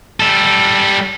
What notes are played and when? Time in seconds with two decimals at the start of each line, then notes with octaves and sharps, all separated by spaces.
0.20 G3 A4